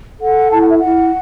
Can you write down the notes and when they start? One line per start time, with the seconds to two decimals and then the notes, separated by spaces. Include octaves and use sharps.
0.21 A4 F#5
0.52 E4 A5
0.61 F#5
0.70 E5
0.79 E4 F#5